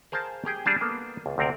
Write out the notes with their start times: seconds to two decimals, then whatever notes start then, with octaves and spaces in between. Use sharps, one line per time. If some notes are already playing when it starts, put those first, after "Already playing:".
0.12 G#4 A#4 C5 F5 A5
0.45 G4 G#4 G5
0.66 G3 D4 G#4 A5
0.81 A#3 B3 A4
1.26 C#2
1.38 D2 C3 C4 A#4